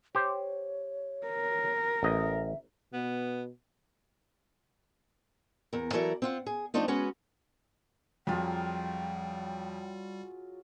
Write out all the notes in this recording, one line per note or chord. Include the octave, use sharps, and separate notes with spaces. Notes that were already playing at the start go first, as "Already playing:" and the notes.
G4 C5 C#5
A#4
A1 D#5 E5
B2 B3
E2 A#4
E3 F#3 E4 A4 A#4 D5
C4 F4 F#5
G#4
F3 A3 C4 D4 D#4 F4
G#3 B3 C#4 F#4
F2 F#3 G3 F4 G#4 G5